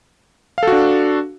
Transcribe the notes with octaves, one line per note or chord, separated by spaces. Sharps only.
D4 F#4 A4 F5